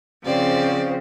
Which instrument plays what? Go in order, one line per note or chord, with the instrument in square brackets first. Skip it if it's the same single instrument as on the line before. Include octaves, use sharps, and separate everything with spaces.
[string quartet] C#3 F3 C4 [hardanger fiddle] D5